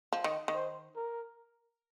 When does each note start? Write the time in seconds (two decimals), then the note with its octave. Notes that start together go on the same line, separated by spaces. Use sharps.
0.13 F3
0.24 D#3
0.48 D#3
0.55 C5
0.96 A#4